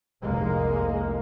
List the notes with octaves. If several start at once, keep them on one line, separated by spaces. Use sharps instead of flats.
F1 C2 G#2 G#3 A#3